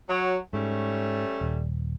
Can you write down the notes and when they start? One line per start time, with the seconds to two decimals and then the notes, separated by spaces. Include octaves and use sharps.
0.08 F#3
0.53 G#2 G3 A3 C#4
1.41 D#1